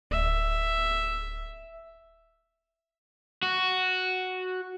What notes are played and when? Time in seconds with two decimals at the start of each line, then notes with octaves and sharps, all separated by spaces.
0.11 D1 E5
3.43 F#4